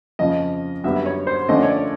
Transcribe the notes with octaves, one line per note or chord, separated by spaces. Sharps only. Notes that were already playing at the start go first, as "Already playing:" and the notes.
F2 C#3 F3 D#5
F#2 D3 G3 B3 E5
C#5
C5
D3 F3 A3 C#4 D#5
D5
C#5
D5